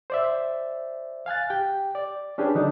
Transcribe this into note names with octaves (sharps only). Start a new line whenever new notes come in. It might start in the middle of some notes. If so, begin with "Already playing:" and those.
C5 D5 E5
F5 G#5 F#6 A6
G4 G5
D5
C#4 D4 G4 G#4 B4
D3 F#3 D4 D#4